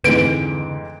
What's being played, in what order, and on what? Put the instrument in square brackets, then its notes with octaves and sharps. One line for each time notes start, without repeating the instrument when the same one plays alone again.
[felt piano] F2 G#2 E3 [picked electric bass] D3 [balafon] A3 B4 [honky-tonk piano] D7